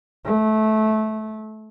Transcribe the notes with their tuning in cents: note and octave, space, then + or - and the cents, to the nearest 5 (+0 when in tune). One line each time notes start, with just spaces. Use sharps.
A3 -20